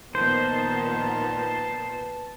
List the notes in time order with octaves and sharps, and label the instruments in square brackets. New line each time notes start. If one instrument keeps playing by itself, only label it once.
[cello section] A#2 F3 B3 [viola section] D#3 [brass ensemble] B4 A5 [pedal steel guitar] C5